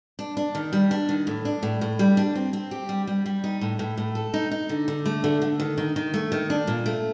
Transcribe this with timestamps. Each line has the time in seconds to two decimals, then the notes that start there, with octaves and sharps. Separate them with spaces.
0.19 D4
0.37 D4
0.55 D#3
0.73 G3
0.91 D4
1.09 D#3
1.27 A2
1.45 D4
1.63 A2
1.81 A2
1.99 G3
2.17 D4
2.35 C4
2.53 C4
2.71 G4
2.89 G3
3.07 G3
3.26 G3
3.44 D#4
3.61 A2
3.79 A2
3.98 A2
4.15 A4
4.34 D#4
4.51 D#4
4.69 D3
4.88 D3
5.06 A3
5.24 D3
5.42 D3
5.60 D#3
5.78 D#3
5.96 D#3
6.14 A3
6.32 D#3
6.50 D4
6.67 A#2
6.86 A3